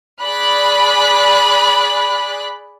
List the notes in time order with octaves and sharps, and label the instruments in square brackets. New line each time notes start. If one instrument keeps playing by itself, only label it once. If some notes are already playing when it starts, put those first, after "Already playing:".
[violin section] G#4 D5 B5 F#6